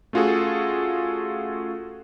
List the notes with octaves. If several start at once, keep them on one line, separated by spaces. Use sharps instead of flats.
A3 C#4 F4 F#4 G#4 A4